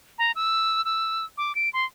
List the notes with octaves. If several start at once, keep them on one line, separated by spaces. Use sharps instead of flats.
A#5
E6
E6
D6
D7
C6